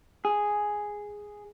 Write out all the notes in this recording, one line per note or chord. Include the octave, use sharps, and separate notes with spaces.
G#4